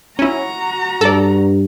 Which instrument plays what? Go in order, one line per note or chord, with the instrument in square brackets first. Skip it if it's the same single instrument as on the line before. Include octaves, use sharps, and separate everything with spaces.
[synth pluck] C#4 E4 [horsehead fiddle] F#4 A#5
[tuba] G2 [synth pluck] A4 D5